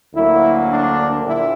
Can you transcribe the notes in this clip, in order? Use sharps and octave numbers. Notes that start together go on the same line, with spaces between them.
D2 D3 F#3 A#3 E4
D4
A#1 A#2 E4